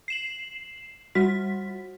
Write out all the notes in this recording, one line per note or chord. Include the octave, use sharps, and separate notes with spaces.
C7 E7 F#7
G3 F#4 B6